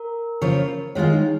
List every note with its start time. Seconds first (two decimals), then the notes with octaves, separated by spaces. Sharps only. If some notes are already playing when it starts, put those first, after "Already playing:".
Already playing: A#4
0.41 C#3 F3 A#3 F4 C#5
0.95 D#3 G#3 F4 G#4 C#5
1.13 D#4